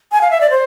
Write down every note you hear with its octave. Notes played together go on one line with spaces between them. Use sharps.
G#5
F5
E5
D5
C5